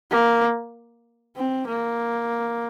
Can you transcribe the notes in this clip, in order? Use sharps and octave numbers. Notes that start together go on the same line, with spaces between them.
A#3
C4
A#3